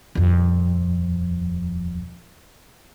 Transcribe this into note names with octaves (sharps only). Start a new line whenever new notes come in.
D#1 F2